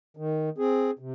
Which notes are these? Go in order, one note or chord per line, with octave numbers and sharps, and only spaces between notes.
D#3
C4 G#4
C3